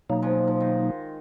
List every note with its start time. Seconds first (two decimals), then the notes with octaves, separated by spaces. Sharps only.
0.10 B2 F#3 A#3 D#4
0.22 F3 G#3
0.47 F3
0.60 D#3